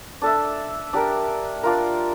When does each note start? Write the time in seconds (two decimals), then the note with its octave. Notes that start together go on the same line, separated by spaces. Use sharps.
0.22 D4 A4 E5
0.93 D4 G4 A#4
1.63 D4 F4 A#4